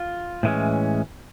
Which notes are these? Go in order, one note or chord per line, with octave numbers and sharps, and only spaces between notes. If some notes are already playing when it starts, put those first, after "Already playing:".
Already playing: F4
A2 E3 G#3 C#4